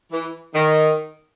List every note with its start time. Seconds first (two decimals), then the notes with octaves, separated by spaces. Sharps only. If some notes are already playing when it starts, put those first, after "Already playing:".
0.12 E3
0.54 D#3